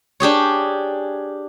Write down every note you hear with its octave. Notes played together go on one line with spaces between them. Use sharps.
D4 G4 G#4 C#5